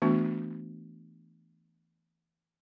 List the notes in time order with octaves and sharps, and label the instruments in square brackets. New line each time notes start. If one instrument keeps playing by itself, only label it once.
[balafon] E3 A3 B3 D4 F#4